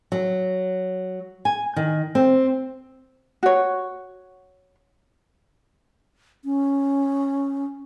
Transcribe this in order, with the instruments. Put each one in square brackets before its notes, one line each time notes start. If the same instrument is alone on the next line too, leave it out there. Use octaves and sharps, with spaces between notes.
[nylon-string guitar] F#3
G#5
D#3
C4
[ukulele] F#4 C#5
[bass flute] C#4